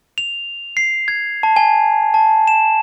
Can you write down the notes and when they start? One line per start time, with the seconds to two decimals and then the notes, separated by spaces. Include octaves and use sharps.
0.18 F7
0.77 C7
1.08 G#6
1.43 A5
1.56 G#5
2.14 A5
2.47 E7